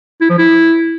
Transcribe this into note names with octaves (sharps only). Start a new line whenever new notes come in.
E4
F3
E4